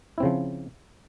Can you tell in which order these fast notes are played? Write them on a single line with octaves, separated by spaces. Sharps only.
E4 C4 C#3 F3